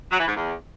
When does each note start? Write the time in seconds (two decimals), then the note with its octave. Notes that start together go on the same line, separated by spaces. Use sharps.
0.11 F#3
0.20 E3
0.28 G#2
0.36 E2